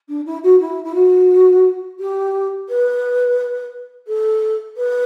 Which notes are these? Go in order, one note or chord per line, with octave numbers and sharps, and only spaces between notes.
D4
E4
F#4
E4
E4
F#4
G4
B4
A4
B4